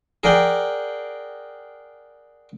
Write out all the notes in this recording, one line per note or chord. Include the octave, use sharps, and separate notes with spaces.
G#4 A#4 D5 F#5 G5